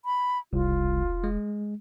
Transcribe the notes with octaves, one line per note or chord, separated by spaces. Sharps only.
B5
E1 C2 F4
G#3